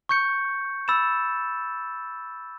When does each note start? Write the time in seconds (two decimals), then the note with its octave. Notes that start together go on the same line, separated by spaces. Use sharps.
0.09 C#6 G6 C#7
0.88 B5 E6 A6 E7